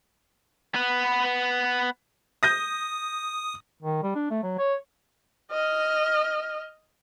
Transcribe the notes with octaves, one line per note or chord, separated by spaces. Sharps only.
B3 B4
D#6 G6 A#6 D#7
D#3
G3
D4
A3
F#3
C#5
D#5 F6